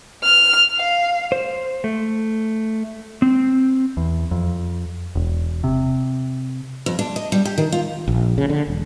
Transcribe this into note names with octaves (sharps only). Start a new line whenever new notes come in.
F6
F5
C5
A3
C4
E2
F2
E1
C3
F2
D4
D#5
G3
G4
D#3
F4
A#1
C#3
D3
E1